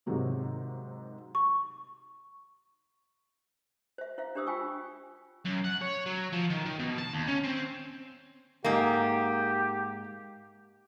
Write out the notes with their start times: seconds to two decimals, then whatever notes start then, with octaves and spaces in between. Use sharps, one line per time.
0.06 G#2 C3 D#3 F#3 G#3
1.35 C#6
3.98 C5 E5
4.18 E4 C5 E5 F5
4.35 D4 G4 C5 D#6 E6
4.46 F4 G5 G#5 C#6 E6
5.45 F#2
5.64 F#5
5.82 C#5
6.06 F#3
6.32 F3
6.50 D#3
6.65 D#3
6.79 B2
6.98 A5
7.14 D#2
7.28 C#4
7.44 C4
8.64 G#2 A#3 G4